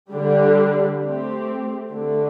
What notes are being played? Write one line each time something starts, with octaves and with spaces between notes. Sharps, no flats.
D3 G3 D4 G4
A3 C4 G4
D3 A3 D4